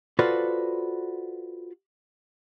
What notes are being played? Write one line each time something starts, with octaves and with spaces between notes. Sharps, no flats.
F4 F#4 A4 B4 C5 D5